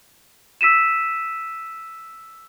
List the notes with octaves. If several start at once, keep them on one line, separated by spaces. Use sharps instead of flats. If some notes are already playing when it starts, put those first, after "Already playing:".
E6 B6 D#7 E7